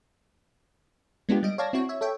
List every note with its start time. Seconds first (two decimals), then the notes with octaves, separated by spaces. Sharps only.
1.29 G#3 B3 D4 F4 G4
1.43 G3 D#5 D7
1.58 C#5 D5 F5 A5 G#6 A#6
1.73 C4 E4 F#4 C#5
1.89 C#5 E5
2.01 A4 C#5 E5 G5